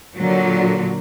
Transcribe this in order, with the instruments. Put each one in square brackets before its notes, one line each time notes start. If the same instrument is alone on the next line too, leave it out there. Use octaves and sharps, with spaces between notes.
[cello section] A#2 D3 F#3